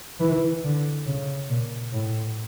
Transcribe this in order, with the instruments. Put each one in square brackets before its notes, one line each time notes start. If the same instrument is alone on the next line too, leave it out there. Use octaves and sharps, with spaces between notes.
[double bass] E3
D3
C#3
A#2
A2